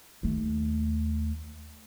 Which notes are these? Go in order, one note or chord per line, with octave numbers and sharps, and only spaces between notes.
D#2 A3